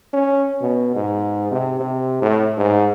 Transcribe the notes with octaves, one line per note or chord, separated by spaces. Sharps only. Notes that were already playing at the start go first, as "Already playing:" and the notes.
C#4
B2
G#2
C3
C3
A2
G#2